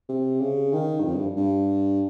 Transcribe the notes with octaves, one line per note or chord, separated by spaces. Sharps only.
C3
C#3
D#3
G2
F2
G2
G2